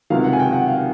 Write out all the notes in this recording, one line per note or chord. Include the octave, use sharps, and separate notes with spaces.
C#2 C3 D#3 F#3 F5
F#5
G#5
G5
F#5
F5